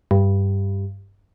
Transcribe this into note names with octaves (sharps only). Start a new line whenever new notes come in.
G2